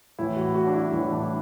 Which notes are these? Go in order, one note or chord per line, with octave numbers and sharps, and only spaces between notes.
A2 E3 E4
F#4
F#4
D4
E4
A2 E3 F#4
E4
D4
E4